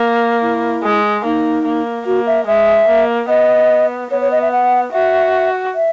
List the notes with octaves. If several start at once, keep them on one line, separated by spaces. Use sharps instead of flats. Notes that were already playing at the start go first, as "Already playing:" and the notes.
Already playing: A#3
E4
G#3
A#3 D#4
A#3
A#3 F#4
E5
G#3 E5
A#3
B3 D#5
B3 C#5
C#5
D#5
E5
F#5
F#4 E5
E5